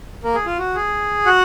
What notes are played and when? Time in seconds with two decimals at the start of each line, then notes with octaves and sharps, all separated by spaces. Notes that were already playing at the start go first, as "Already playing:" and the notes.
0.23 A#3 A#4
0.34 G#4
0.46 F4
0.58 F#4
0.75 G#4
1.26 F#4 F#5